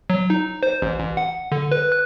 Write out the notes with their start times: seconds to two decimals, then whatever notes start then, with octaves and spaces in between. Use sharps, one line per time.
0.10 F#3
0.30 D#4
0.63 C5
0.82 A1
0.99 A1
1.17 F#5
1.52 D3
1.72 B4
1.92 F#6